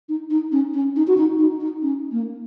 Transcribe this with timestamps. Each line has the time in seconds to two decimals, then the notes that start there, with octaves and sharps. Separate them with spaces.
0.09 D#4
0.30 D#4
0.52 C#4
0.74 C#4
0.96 D#4
1.07 F#4
1.18 D#4
1.39 D#4
1.61 D#4
1.82 C#4
2.12 A#3